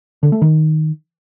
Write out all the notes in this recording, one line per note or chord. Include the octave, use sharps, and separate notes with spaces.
D3
A3
D#3